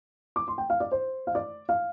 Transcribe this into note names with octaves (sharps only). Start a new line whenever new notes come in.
D6
C6
G5
F5
D5
C5
F5
D5
F5